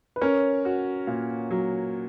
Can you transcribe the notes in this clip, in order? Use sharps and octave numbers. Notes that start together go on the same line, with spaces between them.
B4
C#4 A#4 C#5
F#4
A#2
F#3